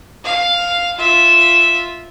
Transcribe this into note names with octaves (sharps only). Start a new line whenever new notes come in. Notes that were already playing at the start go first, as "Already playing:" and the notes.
F5
F4 E5